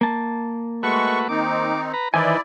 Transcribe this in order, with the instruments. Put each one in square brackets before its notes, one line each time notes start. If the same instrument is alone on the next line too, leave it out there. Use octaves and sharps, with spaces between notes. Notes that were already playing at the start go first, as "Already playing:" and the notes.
[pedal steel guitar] A#3 A5
[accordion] G#3 C#6 [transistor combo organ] A3 F#4 B4
[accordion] D#3 C4 D#4 [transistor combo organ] D6
[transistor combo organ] B4 A#5
[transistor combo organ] D#3 E3 [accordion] E4 D5 [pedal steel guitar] B4 C5 G#5